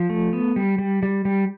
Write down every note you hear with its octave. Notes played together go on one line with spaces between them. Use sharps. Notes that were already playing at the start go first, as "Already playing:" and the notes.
Already playing: F3
A3
B3
G3
G3
G3
G3